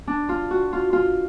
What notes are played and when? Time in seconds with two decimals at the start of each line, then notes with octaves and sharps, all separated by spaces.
0.07 D4
0.29 F4
0.51 F#4
0.73 F4
0.93 F4